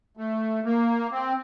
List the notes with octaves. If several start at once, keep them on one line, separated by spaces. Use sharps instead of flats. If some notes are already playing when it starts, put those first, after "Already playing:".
A3
A#3
C4